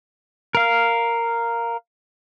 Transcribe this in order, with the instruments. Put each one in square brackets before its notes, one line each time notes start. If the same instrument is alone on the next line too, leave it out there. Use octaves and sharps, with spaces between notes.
[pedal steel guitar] A#4 F5